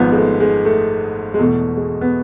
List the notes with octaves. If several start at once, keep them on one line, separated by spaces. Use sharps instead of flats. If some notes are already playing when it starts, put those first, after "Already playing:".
Already playing: G#1 G#2 F3 B3
G#3
A3
G#3
A3
G#3
E2 B2 A3
G#3
B3